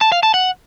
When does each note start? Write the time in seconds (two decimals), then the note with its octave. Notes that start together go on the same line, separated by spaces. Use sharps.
0.01 A5
0.12 F5
0.23 A5
0.34 F#5